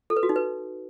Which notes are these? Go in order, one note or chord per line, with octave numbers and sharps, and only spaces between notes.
A4
B4
F#4
D#4
B4